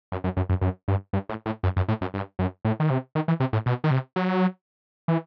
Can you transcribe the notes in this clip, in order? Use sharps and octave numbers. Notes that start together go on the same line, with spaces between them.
F#2
F#2
F#2
F#2
F#2
G2
G2
A2
A2
F#2
F#2
A2
F#2
G2
F#2
A2
D#3
C3
D#3
E3
C3
A2
B2
D#3
C3
F#3
E3